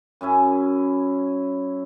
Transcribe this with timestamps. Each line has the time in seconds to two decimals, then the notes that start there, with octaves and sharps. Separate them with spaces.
0.21 F#2 C#4 E4 G#5